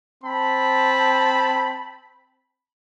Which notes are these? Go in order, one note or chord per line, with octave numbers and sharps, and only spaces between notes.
C4 A5 B5